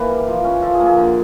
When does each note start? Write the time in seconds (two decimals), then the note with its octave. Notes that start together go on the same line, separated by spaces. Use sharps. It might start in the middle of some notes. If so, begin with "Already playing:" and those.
Already playing: E3 A#3 B4
0.09 G3
0.27 F3
0.44 C#4
0.62 F3 A4
0.74 G#4
0.80 A#3
0.86 G#4
0.97 D3